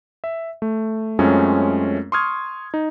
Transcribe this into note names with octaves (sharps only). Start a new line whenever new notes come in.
E5
A3
F#2 G#3 A3 C4 C#4 F4
C6 C#6 D#6 F6 G#6
D#4